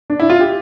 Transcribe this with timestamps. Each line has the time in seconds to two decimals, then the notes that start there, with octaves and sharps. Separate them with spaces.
0.10 D4
0.20 E4
0.30 F4
0.40 G4